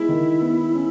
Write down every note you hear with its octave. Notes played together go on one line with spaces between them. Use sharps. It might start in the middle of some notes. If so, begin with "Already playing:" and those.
Already playing: G#3 B3 E4
D#3
B3
C#4